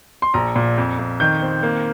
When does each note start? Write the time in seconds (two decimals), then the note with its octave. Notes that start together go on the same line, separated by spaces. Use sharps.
0.22 C6
0.34 A#1 A#5
0.56 A#2
0.78 F2
0.99 F2
1.20 D#3 G6
1.42 C4
1.63 A#3